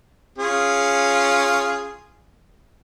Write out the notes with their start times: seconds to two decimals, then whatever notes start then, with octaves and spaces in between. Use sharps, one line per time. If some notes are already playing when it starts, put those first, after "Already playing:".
0.38 C#4 F4 G#4